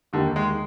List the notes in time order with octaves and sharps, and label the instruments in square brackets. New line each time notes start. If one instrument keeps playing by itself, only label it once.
[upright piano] D#2 D#3 A#3 D#4 G4 [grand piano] D3
[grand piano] G#3